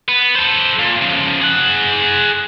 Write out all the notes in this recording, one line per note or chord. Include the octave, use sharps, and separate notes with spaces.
B3
A4 C5
A#2
C#3 F3
G#4 F#5